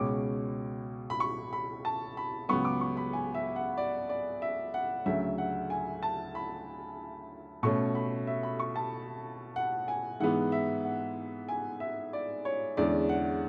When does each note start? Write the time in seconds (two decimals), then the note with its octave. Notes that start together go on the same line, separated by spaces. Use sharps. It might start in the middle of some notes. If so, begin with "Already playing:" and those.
Already playing: C#2 B2 G#3 C#4 D6
1.10 B5
1.20 C#6
1.53 B5
1.85 A5
2.17 B5
2.49 C#2 C#3 F#3 B3 C#6
2.65 D6
2.81 C#6
2.97 B5
3.13 G#5
3.35 E5
3.56 F#5
3.77 D5
4.09 D5
4.42 E5
4.74 F#5
5.06 D2 C#3 F#3 E5
5.38 F#5
5.70 G#5
6.03 A5
6.35 B5
7.63 B2 A3 C#4 C#6
7.95 B5
8.27 E5
8.43 B5
8.60 C#6
8.76 A5
9.56 F#5
9.88 G#5
10.20 G#2 E3 G#3 B3 F#5
10.52 E5
10.85 F#5
11.49 G#5
11.80 E5
12.13 D5
12.45 C#5
12.77 E2 D3 G#3 C#4 D5
13.09 F#5